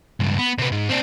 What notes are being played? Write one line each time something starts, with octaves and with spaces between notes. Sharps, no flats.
C#2 G2
B3
C3 B3
G#2
C4 D4